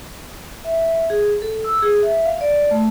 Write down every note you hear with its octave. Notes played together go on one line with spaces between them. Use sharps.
E5
G#4
A4
E6
G#4
E5
F5
D5
A3